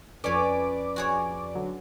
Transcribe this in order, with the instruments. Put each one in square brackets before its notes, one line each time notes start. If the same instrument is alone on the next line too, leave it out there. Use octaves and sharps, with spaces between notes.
[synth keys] F2 D5 D6 [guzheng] C#4 C#5 [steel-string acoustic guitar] B4
[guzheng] F#4 G#4 C#5
[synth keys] D3 F#3